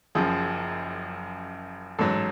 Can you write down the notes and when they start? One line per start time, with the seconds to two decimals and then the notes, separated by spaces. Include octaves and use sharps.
0.15 F#1 F#2 F3 G#4
1.99 A1 G#2 F#3 A4